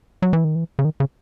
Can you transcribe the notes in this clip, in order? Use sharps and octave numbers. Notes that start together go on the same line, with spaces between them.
F#3
E3
D#3
E3
C#3
D#3
C#3